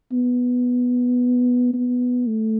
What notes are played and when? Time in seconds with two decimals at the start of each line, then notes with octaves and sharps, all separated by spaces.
0.12 B3
1.74 B3
2.27 A3